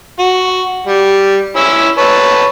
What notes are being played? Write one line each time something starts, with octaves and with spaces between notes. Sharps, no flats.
F#4
G3
C#4 E4 E6
B4 C#5 A5